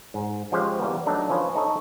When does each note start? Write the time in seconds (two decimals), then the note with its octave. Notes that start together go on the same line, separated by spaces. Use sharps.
0.14 G#2
0.52 F3 G#3 C#4 G4 C5
0.80 E3 G3 A#3 B3
1.06 F#3 A3 D4 D#4
1.30 F3 C#4 F4 B4
1.55 D#4 A4 C#5 D#5